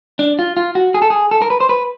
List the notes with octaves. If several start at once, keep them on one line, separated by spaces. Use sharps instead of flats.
D4
F4
F4
F#4
G#4
A4
G#4
A4
A#4
B4
C5
B4